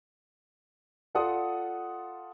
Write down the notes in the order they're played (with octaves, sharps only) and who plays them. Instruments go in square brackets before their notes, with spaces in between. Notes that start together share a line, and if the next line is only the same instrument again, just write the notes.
[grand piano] F4 A4 D5 F#5 C6 D#6